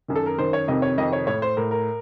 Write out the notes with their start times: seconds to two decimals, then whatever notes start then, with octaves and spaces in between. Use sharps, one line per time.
0.08 F#2 D#3
0.16 A4
0.26 A#4
0.38 F#2 D#3 C5
0.53 C#5
0.68 F2 C3 D#3 D#5
0.82 C#5
0.97 F2 C3 D#3 D#5
1.13 C#5
1.27 A2 C#5
1.42 C5
1.57 A2 A#4
1.71 A#4